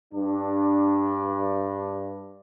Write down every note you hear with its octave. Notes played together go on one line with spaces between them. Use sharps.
G2 D4